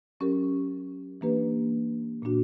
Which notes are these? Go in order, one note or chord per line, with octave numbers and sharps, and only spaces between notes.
F#3 C#4 G4 A#4
E3 A#3 D4 G4 B4
A#2 A#3 D4 F#4